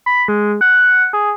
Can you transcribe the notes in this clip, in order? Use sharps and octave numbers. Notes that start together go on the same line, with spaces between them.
B5
G#3
F#5
G#4